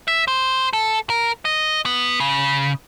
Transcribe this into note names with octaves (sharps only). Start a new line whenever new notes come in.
E5
C5
A4
A#4
D#5
B3
C#3